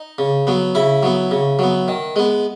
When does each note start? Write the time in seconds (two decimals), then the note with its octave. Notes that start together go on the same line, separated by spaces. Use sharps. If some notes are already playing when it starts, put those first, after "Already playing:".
Already playing: D#4
0.18 C#3
0.47 F#3 B3
0.75 C#3 E4
1.03 F#3 B3
1.31 C#3
1.59 F#3 B3
1.88 D#3
2.16 G#3 B3